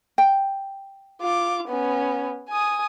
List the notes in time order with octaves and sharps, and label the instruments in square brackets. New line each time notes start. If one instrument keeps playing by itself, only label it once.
[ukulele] G5
[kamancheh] F4 D6
B3 C#4
G#5 D#6